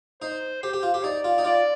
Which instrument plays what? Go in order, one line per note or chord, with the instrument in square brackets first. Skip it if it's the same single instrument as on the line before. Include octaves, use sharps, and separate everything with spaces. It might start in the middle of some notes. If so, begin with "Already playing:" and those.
[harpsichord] D#4 [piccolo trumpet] C5
[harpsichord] G4 [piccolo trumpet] C5
[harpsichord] G4
F4
G4
[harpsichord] D#4 [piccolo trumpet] D5
[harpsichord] F4
D#4
[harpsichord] F4 [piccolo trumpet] D5